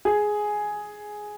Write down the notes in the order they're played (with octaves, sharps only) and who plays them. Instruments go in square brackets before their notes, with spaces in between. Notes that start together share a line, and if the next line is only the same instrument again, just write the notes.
[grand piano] G#4